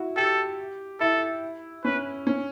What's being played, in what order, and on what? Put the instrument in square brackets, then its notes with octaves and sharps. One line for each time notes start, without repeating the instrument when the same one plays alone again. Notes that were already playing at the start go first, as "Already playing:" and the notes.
Already playing: [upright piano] E4 F#4
[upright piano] G4 [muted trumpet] A4
[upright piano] E4 [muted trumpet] A4
[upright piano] C#4 [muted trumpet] B4
[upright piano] C#4